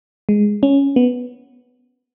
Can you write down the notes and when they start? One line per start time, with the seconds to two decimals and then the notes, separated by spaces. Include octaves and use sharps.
0.29 G#3
0.63 C#4
0.96 B3